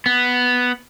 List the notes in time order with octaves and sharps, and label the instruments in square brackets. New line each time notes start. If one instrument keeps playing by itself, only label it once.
[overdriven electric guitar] B3